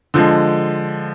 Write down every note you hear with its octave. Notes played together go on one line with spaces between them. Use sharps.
D3 F3 G#3